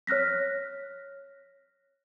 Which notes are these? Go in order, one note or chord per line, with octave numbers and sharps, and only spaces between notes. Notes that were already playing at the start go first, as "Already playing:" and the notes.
C#5 F6 F#6 A#6 B6